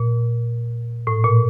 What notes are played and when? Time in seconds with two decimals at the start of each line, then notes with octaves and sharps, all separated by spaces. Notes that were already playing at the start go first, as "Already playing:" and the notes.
Already playing: A#2
1.07 A2
1.24 A#2